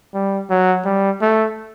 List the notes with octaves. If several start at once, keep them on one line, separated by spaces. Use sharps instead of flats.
G3
F#3
G3
A3